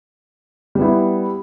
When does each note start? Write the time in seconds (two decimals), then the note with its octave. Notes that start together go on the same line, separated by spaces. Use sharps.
0.75 G3
0.78 B3
0.82 E4